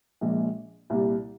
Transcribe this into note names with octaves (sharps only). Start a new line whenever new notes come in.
A#1 A#2 G#3
C2 A#2 G3